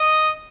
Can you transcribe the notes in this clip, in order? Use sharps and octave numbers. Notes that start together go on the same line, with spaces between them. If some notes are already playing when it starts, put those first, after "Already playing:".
Already playing: D#5